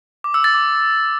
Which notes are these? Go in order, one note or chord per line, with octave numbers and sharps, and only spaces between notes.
D6
E6
A6
D6